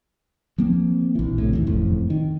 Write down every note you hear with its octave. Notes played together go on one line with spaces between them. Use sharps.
F3 A#3 C4
A#1 E3
A2 C3
A#1 D#2 E3
F#1 F2 A2
D#3